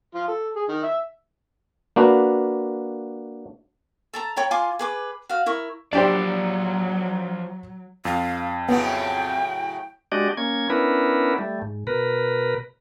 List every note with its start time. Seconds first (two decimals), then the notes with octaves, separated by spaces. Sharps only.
0.15 F3 F4
0.28 A4
0.56 G#4
0.69 D#3
0.83 E5
1.96 A#3 D4 F#4 B4
4.14 A4 A5 A#5
4.36 C#5 G5 A#5 B5
4.51 F4 G#5 C6 D6
4.79 G#4 B4 D6
5.29 F#4 F5
5.46 E4 A#4 C#6
5.93 F3 F#3 D4 G4 C5 D5
8.05 F2 F5
8.69 A2 C#3 F#3 B3 G5
10.12 G#3 D4 F#4 G4 D5 D#5
10.37 A#3 C#4 G#6
10.70 B3 C#4 D4 E4 A#4 B4
11.38 G3 A3
11.62 G#2
11.87 B2 A#4 B4